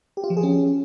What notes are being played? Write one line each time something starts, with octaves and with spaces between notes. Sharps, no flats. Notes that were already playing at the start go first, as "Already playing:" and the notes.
G4
F4
F3
G#4
C#4